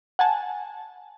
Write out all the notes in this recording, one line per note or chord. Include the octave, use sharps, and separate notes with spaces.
F#5 G#5 A5